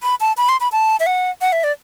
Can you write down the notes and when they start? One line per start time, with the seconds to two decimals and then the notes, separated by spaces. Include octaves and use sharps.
0.03 B5
0.20 A5
0.37 B5
0.49 C6
0.60 B5
0.72 A5
1.00 E5
1.06 F#5
1.41 F#5
1.52 E5
1.64 D5